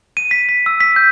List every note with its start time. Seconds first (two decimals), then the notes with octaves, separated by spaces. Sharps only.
0.17 D#7
0.31 B6
0.49 B6
0.66 E6
0.80 B6
0.96 G6